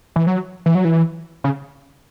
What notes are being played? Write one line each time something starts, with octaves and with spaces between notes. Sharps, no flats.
E3
F#3
E3
F#3
E3
C#3